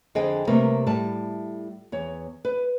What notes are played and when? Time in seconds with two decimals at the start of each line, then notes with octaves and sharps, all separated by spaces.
0.15 F2 D3 G#4 C5 D#5 G5
0.47 C3 G3 A3 A#3 A#4 B4
0.86 A2 G3 A5
1.92 E2 C#5
2.45 B4